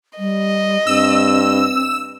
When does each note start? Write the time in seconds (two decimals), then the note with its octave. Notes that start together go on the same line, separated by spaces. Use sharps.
0.18 G3 D#5
0.87 G2 C4 E6